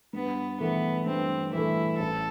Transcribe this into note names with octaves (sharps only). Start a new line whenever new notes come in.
G2 B3
E3 A3 B3
G2 C4
E3 A3 E4
A1 A4